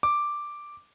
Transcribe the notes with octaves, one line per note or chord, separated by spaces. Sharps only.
D6